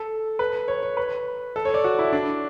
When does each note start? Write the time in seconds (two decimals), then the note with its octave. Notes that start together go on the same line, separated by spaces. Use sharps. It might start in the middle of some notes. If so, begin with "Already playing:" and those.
Already playing: A4
0.39 B4
0.68 C#5
0.83 C#5
0.97 B4
1.56 A4
1.65 C#5
1.74 D5
1.84 F#4
1.99 E4
2.12 D4